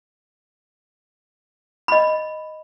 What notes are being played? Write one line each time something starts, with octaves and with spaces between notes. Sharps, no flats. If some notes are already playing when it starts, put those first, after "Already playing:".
D#5 B5